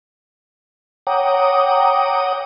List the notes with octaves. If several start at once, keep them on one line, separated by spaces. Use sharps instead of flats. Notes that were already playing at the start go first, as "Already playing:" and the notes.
C#5 F#5 G5 A#5 D6 D#6